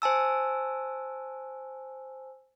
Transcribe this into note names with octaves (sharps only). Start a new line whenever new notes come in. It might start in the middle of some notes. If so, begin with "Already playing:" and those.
C5 G#5 A5 E6